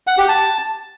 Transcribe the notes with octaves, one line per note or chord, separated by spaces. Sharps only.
F#5
G4
A5